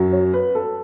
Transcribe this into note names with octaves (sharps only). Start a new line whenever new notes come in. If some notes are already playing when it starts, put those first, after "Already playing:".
Already playing: F#2 F#3
C#5
B4
A4